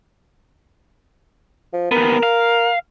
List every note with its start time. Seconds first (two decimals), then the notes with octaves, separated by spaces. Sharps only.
1.73 F3
1.92 D#2 B3 A#4
2.23 F5